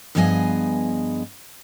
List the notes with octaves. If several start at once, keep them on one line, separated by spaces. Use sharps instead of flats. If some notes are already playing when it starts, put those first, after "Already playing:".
G2 F3 B3 G#4 D#5 G#5